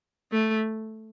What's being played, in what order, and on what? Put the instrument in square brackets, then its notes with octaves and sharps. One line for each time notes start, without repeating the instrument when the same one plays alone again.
[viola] A3